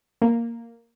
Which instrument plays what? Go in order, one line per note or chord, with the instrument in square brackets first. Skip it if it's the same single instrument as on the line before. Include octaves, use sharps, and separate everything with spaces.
[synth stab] A#3